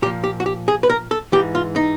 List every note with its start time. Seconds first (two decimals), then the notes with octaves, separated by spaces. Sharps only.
0.02 A#2 G4
0.06 F3
0.24 G4
0.40 F#4
0.46 G4
0.68 G#4
0.83 B4
0.90 A#4
1.11 A4
1.32 G#2 E3 G4
1.55 F4
1.76 D#4